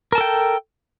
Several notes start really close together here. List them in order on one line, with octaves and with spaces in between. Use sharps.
A#4 A5 A4 G5